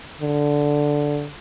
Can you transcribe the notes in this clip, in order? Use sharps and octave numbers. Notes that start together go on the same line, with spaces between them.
D3